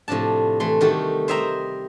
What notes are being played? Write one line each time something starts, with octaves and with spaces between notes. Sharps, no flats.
A2 C3 F3 D4 A5
E3 A3 C6
D#3 G3 A3 F#4 G4
C5 D#5 E5 G5 A#5